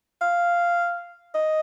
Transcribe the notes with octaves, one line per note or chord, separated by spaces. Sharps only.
F5
D#5